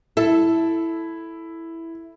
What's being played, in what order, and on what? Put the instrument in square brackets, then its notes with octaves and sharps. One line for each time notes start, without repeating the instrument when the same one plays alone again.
[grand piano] E4 [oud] A4